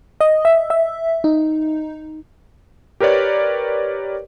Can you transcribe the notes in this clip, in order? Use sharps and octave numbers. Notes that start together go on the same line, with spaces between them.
D#5
E5
E5
D#4
G4 A#4 B4 C#5 D5